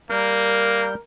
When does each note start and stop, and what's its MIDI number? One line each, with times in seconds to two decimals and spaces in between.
0.10 0.95 55
0.10 0.88 58
0.10 0.99 70
0.10 0.95 91